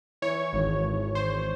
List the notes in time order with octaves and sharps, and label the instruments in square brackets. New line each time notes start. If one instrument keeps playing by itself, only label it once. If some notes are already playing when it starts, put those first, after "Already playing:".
[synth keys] E3 C#5
G#1
G#1
G#1 C5